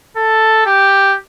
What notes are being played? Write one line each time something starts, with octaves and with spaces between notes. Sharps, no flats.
A4
G4